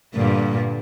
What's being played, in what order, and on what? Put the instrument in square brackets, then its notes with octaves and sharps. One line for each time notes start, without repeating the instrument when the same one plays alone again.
[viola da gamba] G2 A#2 D3